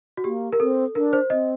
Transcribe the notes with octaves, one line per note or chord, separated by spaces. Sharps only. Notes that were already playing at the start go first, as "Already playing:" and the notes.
F#4
A#3 G4
A#4
C4 A4
D4 A#4
C5
C4 D#5